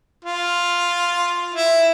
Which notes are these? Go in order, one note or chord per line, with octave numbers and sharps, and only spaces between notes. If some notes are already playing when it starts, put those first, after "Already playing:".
F4
E4